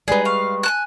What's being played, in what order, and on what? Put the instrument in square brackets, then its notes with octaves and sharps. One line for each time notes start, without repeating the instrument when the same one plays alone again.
[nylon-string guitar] G3 G#3 B4 [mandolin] D#4 G#4 [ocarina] D5
[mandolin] F5 [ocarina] C#6
[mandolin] G#5 A5 F#6